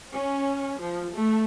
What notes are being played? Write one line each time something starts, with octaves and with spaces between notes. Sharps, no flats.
C#4
F3
A3